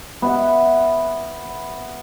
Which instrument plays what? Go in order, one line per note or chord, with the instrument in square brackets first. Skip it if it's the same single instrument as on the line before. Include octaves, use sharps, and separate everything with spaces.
[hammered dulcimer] B3 E5 F#5